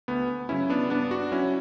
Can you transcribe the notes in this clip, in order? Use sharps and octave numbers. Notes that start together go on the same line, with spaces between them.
D2 B3
C#3 F#3 C#4 E4
B3 D4
G2 B3 D4
D4 F#4
F#3 C#4 E4